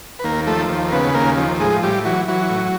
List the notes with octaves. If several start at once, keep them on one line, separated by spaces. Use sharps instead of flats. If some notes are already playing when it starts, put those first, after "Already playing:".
B4
D#2 A#3 A#4
F3 A3 A4
D#2
A#4
C#3 B3 B4
B4
D#2 A#3 A#4
F3
A2 G#3 G#4
A2 G3 G4
E3 F#3 F#4
E3 F#3 F#4
A2